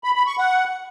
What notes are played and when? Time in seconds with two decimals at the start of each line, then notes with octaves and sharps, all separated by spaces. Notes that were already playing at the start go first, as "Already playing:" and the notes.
0.04 B5
0.15 B5
0.27 C#6
0.38 F#5